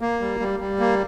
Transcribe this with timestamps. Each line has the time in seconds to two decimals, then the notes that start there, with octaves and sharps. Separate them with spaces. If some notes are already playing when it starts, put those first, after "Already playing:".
0.01 A#3
0.21 G3
0.40 G3
0.60 G3
0.79 A#3